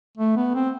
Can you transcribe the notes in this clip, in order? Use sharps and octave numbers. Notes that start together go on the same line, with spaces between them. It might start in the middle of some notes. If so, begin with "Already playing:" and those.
A3
B3
C4